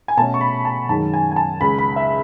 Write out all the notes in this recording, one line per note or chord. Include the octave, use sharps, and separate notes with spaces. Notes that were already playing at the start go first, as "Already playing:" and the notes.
G#5
B2 A3 C#4 A5
C#6
B5
A5
F#2 D#3 G#3 C#4 A5
G#5
G#5
A5
C#2 C#3 G#3 B5
B5
E5